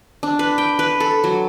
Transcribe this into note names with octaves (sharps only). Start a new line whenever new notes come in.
D4
B4
G5
B4
A4
F#3